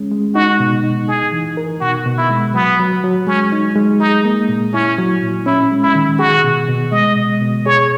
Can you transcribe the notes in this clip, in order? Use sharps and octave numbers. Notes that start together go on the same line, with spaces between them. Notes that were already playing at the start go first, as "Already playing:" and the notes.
Already playing: G#3 C#4
G#3
D#4 F#4
B2
D#4
D#4 G#4
E3
A#4
B2 F#4
B2
E4
G#3
F#3 B3
F#3
F#3
G#3 C#4
D#4
G#3
D#4 G#4
A#3
A#2
C#4 E4
F#3
A#2
C#4 E4
G#3
E4
D#3
F#4 G#4
B2
B2
G#3 D#5
B2
B2
G#4 C#5